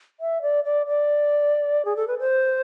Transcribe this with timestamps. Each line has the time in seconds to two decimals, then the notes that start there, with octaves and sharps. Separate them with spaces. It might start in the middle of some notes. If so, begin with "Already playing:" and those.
0.20 E5
0.42 D5
0.64 D5
0.87 D5
1.85 G#4
1.96 A4
2.08 B4
2.19 C5